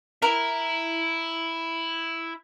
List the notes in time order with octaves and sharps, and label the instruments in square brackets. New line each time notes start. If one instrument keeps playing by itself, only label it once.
[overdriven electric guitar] E4 E5 [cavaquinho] A#4